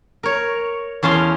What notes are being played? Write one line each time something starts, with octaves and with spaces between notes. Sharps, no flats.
A#4 C#5
E2 C#4 F5 A5 C6